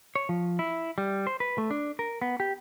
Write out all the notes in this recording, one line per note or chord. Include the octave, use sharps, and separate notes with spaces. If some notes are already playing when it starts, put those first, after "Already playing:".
C#5
F3
E4
G3
C5
B4
A3
D4
A#4
B3
G4